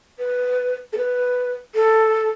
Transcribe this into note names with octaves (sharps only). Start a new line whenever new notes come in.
B4
A4
B4
A4